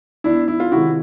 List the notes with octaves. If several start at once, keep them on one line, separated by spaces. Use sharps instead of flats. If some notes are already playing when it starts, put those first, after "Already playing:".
E2 D4 E4
E4
F4
C3 D#3 G#3 E4 F#4